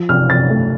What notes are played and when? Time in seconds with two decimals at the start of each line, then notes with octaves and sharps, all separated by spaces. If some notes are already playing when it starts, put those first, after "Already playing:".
Already playing: F3
0.09 C3 F6
0.30 C3 A6
0.50 A3